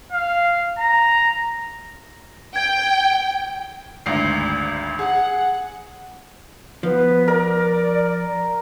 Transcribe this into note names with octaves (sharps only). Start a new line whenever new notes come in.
F5
A#5
G5 G#6
G#1 D2 C7
G#4 F#5
F3 B3
A#4 D5